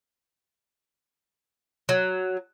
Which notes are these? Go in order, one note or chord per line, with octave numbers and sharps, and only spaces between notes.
F#3